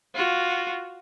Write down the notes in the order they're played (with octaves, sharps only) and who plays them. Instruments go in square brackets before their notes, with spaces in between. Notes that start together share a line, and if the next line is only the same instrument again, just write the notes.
[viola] F4 F#4